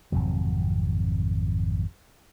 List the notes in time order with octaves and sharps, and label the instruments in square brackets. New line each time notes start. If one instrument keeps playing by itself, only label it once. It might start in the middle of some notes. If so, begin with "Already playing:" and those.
[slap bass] G#1 F2 C3 F#3